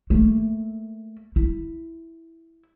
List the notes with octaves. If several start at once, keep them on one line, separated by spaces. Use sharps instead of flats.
A3 A#3
E4